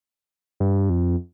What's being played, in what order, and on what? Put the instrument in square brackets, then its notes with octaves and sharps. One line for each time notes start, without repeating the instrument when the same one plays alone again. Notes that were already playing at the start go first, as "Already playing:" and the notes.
[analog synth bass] G2
F2